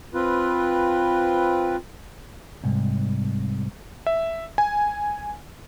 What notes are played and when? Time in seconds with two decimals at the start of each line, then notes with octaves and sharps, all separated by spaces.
0.14 C4 F4 B4
2.64 C2 G#2
4.06 E5
4.58 G#5